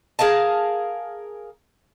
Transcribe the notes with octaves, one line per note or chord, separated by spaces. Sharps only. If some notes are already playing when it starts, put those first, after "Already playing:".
G#4 A#4 F5 A5